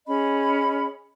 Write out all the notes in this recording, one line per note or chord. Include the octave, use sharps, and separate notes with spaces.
C#4 G#4 D#5 B5